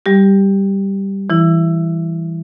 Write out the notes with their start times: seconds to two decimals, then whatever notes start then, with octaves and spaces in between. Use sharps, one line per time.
0.06 G3 G4
1.30 E3 E4